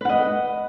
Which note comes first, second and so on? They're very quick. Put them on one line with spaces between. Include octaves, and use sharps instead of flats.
B4 F#5 D#5